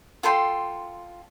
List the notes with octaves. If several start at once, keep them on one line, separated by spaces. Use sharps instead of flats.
F4 A4 G5 C6